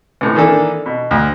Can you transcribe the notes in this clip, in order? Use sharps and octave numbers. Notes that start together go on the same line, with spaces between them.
C#2 A2
D#3 E3 A#3 D4 A4
B2
D2